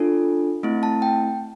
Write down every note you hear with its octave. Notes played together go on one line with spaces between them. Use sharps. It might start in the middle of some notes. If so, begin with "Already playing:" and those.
Already playing: D4 F4 A4
A3 C4 E4
A5
G5